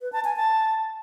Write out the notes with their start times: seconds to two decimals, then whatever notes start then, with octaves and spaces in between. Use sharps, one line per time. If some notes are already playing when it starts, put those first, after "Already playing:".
0.01 B4
0.13 A5
0.24 G#5
0.36 A5